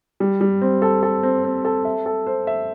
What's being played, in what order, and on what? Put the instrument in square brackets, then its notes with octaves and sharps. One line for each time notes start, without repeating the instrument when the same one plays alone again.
[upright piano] G3
G3
C4
A4
A4
C4
C4
A4
E5
A4
C5
E5